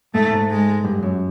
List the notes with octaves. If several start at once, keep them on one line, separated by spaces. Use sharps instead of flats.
G#2 A3
G#2
G#3
G2
F#2